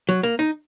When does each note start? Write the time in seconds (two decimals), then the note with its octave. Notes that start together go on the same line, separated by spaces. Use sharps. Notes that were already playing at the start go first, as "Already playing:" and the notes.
0.09 F#3
0.23 A#3
0.39 D#4